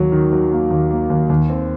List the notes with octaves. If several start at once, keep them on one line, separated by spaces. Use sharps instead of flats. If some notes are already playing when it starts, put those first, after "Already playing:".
Already playing: D#2 F#3
D#3
F#3
A#3
D#2
A#3
D#2
D#2
C4